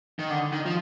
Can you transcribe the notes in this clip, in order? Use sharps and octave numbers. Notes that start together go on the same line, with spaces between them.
D#3
D3
D#3
F3